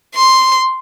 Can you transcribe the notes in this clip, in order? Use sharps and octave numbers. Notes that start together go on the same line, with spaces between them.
C6